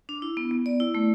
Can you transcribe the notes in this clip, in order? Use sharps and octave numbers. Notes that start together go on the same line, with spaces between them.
D4
E4
B3
B3
D5
E4
A3